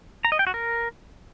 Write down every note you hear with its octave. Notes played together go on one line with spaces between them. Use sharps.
A#5
D#5
G5
F#4
A#4